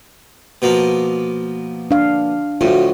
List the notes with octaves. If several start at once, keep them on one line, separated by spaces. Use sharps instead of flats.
B2 F3 A#3
D4 F5
D2 A2 F4 F#4